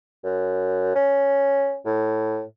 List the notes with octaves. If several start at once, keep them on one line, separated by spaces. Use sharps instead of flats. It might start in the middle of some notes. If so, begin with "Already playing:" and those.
F#2
C#4
A2